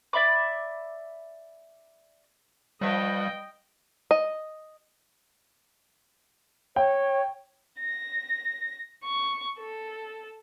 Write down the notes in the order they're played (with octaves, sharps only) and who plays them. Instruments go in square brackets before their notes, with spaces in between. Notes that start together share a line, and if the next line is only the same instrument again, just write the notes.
[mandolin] D5 E5 B5 D6
[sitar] F3 B4 E5 [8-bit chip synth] G3 [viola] D#5 G5
[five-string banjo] D#5
[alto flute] C#5 [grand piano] G5
[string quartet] A#6
C#6
A4